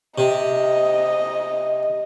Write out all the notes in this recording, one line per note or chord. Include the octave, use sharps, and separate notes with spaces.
C3 D#5